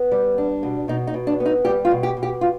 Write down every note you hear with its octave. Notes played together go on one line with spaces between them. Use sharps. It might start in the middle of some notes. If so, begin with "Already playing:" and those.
Already playing: B3
G3
D4
B2
B2 D#4
D#4
B2
D4
B3
D#4
G3 G4
F4
B2
G4
B2
G4
F4